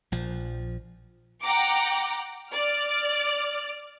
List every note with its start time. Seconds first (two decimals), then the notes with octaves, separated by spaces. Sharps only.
0.12 A#1 F3
1.43 F#5 G5 A#5 D6
2.51 D5 F6